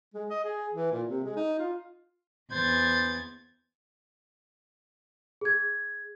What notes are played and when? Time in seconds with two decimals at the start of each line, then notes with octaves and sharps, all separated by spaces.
0.14 G#3
0.30 D#5
0.44 G#4
0.73 E3
0.92 A#2
1.07 C3
1.24 G#3
1.36 D#4
1.59 F4
2.51 E2 C5 G#6 A6
5.41 G#4 G#6